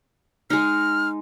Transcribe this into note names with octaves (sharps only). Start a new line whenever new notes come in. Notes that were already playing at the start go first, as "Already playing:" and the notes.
G#3 D#4 F6